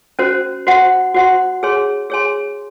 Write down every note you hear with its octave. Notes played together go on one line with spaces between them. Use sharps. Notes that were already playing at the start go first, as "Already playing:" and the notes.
C#4 F#4 C5
F#4 C5 F#5 C6
F#4 C5 F#5 C6
G#4 C#5 G#5 C6
G#4 C#5 G#5 C6